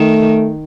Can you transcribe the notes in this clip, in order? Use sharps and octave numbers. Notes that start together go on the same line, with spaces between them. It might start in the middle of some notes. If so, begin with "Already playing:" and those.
Already playing: D#3 A3